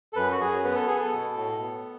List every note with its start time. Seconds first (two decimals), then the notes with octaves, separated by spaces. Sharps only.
0.13 A4
0.16 F#2 B4
0.31 F#4
0.41 F#2 G#4
0.64 B3 B4
0.75 A4
0.87 B3 G#4
0.97 A4
1.13 B2
1.36 A2
1.61 B3